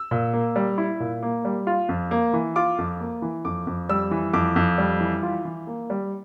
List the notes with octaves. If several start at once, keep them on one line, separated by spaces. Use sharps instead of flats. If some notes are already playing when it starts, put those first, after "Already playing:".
Already playing: E6
A#2
A#3
G3
E4
A#2
A#3
G3
F4
F2
A#3
E3
F4 D6
F2
A#3
E3
F2 D6
F2
G3 E6
E3
F2 D6
F2
G3
E3
F4
E3
A#3
G3